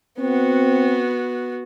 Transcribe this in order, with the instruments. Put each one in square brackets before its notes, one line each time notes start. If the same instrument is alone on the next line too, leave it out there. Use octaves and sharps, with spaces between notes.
[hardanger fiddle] B3 F#4 [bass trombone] C4